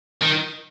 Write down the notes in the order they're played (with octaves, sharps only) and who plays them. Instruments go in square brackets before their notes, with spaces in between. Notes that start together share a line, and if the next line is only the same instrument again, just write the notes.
[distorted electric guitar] D#3